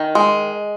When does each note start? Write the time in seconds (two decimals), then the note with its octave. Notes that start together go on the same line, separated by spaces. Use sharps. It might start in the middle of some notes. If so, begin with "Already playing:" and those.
Already playing: D#3
0.15 G#3